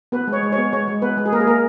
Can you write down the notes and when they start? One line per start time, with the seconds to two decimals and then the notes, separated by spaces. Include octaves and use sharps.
0.12 B3 B4
0.27 G#3
0.33 C#5
0.43 G#3
0.52 C#5
0.58 B3
0.73 G#3 C#5
0.88 G#3
1.02 B3 B4
1.17 G#3
1.26 G#4
1.32 A#3 A#4
1.40 G#4
1.47 A#3 A#4